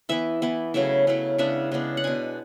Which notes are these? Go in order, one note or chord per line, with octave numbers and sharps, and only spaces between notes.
E3 B3 E4 E5
E3 B3 E4
C#3 F#3 A3 E4 E5
C#3 F#3 A3 E4
C#3 G#3 B3 D4 E5
C#3 G#3 B3 D4
F#5
B2 G#3 D4 G#5